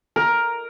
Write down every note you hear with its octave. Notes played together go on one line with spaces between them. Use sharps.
A#4